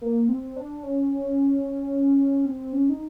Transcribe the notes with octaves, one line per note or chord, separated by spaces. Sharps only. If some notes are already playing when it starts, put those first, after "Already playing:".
A#3
C4
D4
C#4
C4
C#4
D#4